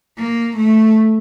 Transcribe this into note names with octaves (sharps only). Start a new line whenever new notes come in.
A#3
A3